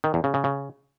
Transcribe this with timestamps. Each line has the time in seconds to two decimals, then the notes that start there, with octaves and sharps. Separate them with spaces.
0.04 D#3
0.14 E2
0.24 C#3
0.34 C#3
0.44 C#3